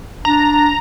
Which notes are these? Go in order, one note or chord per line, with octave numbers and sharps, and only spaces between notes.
D4 A#5